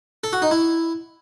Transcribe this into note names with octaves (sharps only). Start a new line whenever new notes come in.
A4
F#4
D#4
E4